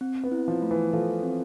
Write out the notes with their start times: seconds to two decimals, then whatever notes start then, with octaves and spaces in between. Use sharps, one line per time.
0.01 C4
0.24 B3
0.32 E4
0.48 F3
0.62 A3
0.71 E3
0.93 F3 A4
1.23 C4